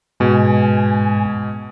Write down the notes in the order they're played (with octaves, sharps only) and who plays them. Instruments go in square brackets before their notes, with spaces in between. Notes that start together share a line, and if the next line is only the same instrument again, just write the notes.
[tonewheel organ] G#2 G#5 [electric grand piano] B2 G#3